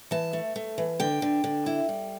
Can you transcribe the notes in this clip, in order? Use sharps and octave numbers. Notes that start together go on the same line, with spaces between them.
E3 A5
A3
A3
E3
D3 G5
D3
D3
E4
G3